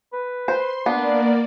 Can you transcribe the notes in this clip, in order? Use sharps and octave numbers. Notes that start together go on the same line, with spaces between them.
B4
C5 C6
A#3 B3 D4 D5